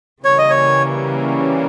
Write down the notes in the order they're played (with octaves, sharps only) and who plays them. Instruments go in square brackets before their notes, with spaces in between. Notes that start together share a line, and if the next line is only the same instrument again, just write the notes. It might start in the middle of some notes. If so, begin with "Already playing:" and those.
[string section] C#3 E3 G3 A#3 C#4 [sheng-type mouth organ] C#5
[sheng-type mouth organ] D#5
C#5